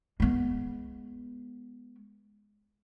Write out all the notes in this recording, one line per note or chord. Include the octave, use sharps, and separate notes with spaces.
G#3 B3